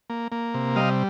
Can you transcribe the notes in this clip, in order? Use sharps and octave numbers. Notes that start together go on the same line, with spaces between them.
A#3
A#3
C3
G3 D#5 F5